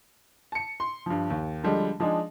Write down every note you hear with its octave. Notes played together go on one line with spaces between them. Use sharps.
A5 C#7
C6
G2 F3
D#2
D3 F3 G3 G#3
F3 G#3 D4 D#4 G#4